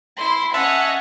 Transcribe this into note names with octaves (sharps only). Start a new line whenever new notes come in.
E4 C6
C#4 C#5 D#5 E5 F#5 A5